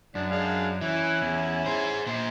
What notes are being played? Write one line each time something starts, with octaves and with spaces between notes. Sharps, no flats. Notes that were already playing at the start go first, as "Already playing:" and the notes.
F#2 D4
G#3 D4 F5
E3 C#4 E4
E2
G#4 C5
A#2 C5